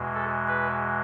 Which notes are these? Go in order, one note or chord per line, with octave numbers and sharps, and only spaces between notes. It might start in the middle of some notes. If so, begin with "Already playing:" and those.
Already playing: E2 B2 G#3
A4
B4